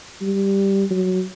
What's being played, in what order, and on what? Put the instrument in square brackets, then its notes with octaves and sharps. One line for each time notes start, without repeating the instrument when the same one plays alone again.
[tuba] G3
F#3